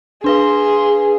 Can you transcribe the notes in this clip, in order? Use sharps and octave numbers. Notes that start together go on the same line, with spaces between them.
D4 G#4 B4 F5 C6